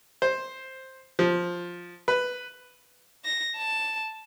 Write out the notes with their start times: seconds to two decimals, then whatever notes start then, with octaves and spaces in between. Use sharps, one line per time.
0.22 C5
1.19 F3
2.08 B4
3.25 A#6
3.57 A5